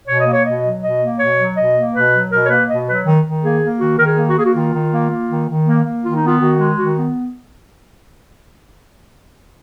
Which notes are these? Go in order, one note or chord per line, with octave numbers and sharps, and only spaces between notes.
B2 C#5
D#5
A#3
C#5
B2 D#5
F#3
B2 D#5
A#3
B2 C#5
F#3
B2 D#5
A#3
B2 B4
F#3
B2 A#4
C#5
A#3 B4
B2 D#5
F#3 B4
D#3
D#3
A#3 G#4
A#3
D#3 F#4
D#3 A#4
G#4
A#3
F#4
A#3 G#4
F#4
D#3 F4
D#3
A#3
A#3
D#3
D#3
A#3
A#3
D#3 F4
D#4
B3 F4
D#3 F#4
G#3
D#3 F#4
B3